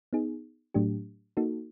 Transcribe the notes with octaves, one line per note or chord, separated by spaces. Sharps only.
B3 D#4 G#4
A2 F#3 A3 D4 G4
A#3 D#4 F#4 A4